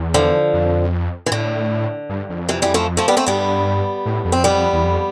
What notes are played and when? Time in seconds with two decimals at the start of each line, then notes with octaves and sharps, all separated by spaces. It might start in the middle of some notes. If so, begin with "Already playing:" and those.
Already playing: E2
0.14 D3 F3
0.53 F2
1.26 E3
1.31 A2 D3
2.09 G2
2.29 F2
2.49 C3 E3
2.62 E3 G3
2.74 F3 A3
2.97 F3 A3
3.08 G3 B3
3.17 A3 C4
3.26 G2 G3 B3
4.06 A2
4.25 F2
4.32 C4
4.44 G3 B3
4.73 E2
4.84 F2